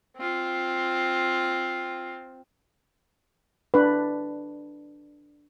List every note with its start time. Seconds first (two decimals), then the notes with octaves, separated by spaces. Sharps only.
0.16 C4 F4
3.74 D4 B4